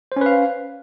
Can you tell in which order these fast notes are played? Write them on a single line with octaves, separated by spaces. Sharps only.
C5 C#4 B4 F5